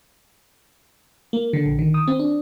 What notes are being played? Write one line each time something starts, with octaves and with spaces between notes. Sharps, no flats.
A#3
D3
A#1
D#3
D#6
C4
D4